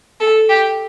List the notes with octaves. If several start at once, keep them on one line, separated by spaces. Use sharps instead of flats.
A4
G4